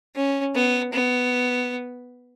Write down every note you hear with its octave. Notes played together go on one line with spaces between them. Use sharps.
C#4
B3
B3